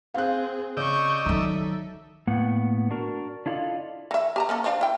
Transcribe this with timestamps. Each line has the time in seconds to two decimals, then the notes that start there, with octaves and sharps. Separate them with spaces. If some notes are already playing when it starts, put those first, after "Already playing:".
0.14 C4 G#4 F5 F#6
0.77 C#3 D5 D#5 C#6 E6 G6
1.26 D#3 F#3 D#4 A4 E5
2.27 A2 A#3 B3 F#5
2.91 D4 F#4 A#4
3.46 D4 E4 F4 A4 D5 D#5
4.11 E3 E5
4.36 G4 A5 A#5
4.49 A#3 C#4 A4
4.64 F3 D4 F5
4.81 E4 G5